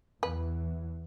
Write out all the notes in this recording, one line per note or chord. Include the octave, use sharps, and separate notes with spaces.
E2 E3 B4